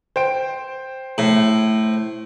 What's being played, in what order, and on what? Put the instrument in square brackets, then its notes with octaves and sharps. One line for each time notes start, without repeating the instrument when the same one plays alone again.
[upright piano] C5 G5 D7
[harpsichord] A2